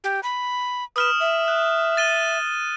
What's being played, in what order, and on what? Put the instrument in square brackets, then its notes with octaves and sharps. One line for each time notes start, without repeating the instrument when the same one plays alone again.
[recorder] G4
B5
[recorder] B4 [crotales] D#6 F6 E7
[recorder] E5
[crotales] F#6
A6 D#7 G7